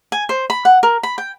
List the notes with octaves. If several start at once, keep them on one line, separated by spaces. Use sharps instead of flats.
G#5
C5
B5
F#5
A#4
B5
G5